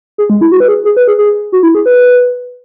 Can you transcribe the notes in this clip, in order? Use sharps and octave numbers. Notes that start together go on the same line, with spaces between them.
G#4
G#3
E4
F#4
B4
G#4
G#4
B4
G#4
G#4
F#4
E4
G#4
B4